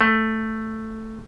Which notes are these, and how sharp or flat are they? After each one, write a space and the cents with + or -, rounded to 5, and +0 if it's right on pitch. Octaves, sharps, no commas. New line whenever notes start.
A3 +5